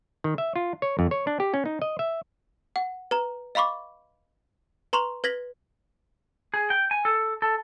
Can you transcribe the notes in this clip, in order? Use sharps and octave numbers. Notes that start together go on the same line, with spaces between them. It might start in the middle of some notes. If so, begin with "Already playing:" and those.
D#3
E5
F4
C#5
F2
C#5
D4
G4
C#4
D#4
D#5
E5
F#5
B4 A#5
D#5 F5 B5 C#6 D6
B4 A#5 C6 C#6 F7 F#7
B4 G#6 A#6 B6 F#7
G#4
G5
G#5
A4
A4